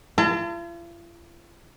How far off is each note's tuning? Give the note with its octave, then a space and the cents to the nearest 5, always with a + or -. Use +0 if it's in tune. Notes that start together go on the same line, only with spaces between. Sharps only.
F4 -45 A5 +40